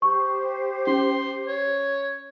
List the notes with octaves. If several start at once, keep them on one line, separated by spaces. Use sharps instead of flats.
G4 C5 C#6
C#4 C6
C#5